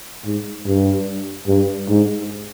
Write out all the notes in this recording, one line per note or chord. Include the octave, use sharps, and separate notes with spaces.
G#2
G2
G2
G#2